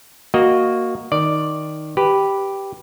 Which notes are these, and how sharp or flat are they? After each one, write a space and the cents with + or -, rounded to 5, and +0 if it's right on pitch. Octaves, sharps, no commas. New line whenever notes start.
A#3 +0 F#4 +0 D#5 +0
D#3 +0 D5 +0
G4 +0 B4 +0